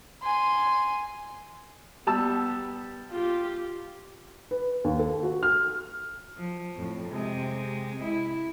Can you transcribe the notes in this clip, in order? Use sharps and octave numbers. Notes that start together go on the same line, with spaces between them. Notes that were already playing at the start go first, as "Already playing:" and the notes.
G#5 C6
G3 B3 A5 E6
F4 G4
B4
D#2
A4
F#4
F6
F3
F2 A2
C3 G#3
E4